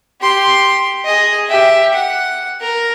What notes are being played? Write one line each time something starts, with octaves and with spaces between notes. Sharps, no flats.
G4 C6
G#4 D#5
G4 E5
F#5
A#4